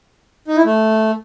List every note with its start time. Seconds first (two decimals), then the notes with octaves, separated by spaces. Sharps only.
0.47 D#4
0.57 E4
0.66 A3